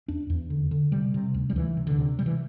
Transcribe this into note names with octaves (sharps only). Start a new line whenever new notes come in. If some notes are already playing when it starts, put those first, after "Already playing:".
E2 D4
E2
D3
D3
C3 G3
C3
D2
G3
D2 E3
C3
D3
C3
C3 G3
E3